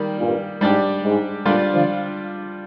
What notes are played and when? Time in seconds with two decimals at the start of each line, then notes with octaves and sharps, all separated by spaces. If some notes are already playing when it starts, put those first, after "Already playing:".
Already playing: D#3 G3 A#3
0.18 G2 A#2
0.60 G#2 G3 D4 G4
1.03 G#2
1.45 A#2 D3 G3 D4 F4
1.73 D3 F3